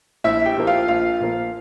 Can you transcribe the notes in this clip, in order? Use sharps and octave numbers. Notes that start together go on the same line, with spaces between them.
A#1 E4 E5
G4 G5
A#2 F3 A#3
F4 F5
A#1 F4 F5
A#2 F3 A#3